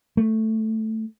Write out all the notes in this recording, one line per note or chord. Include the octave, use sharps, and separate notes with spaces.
A3